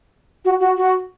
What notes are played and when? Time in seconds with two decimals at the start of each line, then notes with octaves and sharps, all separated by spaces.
0.45 F#4
0.60 F#4
0.77 F#4